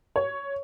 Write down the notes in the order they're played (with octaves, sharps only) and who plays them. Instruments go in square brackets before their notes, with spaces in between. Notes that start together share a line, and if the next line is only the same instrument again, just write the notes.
[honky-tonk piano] C#5